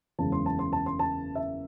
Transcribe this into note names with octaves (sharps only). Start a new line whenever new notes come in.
F#1 E2 C#3 G#3 A5
C6
A5
C6
A5
C6
A5
E5